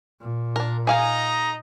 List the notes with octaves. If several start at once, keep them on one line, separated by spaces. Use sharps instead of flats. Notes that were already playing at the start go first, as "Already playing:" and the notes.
A#2
D4 A#4
D#4 G#4 D#5 F5 G#5 A#5